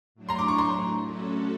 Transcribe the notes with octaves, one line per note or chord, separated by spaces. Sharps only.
A2 F#3 A3 D4
A#5 C6
D6
C#6
A#5 C6
F#3 A3 C#4 F#4 A4